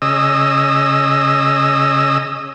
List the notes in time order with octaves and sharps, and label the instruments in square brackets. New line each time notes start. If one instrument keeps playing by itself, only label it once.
[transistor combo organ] C#3 D#5 E6